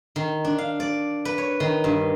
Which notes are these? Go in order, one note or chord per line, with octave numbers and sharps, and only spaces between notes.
D#3
D4
F5
D5
B4
C#5
D#3
G2